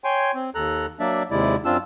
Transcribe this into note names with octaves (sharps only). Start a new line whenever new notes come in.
C#5 G5 G#5 C6
C4
D#2 A4 A#5 F#6
F#3 A#3 D4 D5 E5
D#2 C3 G#3 E4 D5
F#2 C4 D4 F4 E6